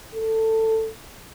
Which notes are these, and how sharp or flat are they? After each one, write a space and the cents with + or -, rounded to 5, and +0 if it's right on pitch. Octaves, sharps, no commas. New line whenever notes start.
A4 +15